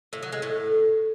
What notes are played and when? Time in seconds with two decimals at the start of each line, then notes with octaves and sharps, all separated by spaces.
0.13 A2
0.23 F#3
0.32 G#3
0.42 A2